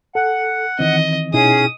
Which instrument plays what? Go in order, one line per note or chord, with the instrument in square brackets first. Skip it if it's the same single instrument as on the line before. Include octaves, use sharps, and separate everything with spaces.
[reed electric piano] A4 [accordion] F#5
[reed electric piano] D#3 E3 C4 [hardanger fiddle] D#5
[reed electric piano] B2 D#4 E4 [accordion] C#4 G#4 [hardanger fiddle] D#6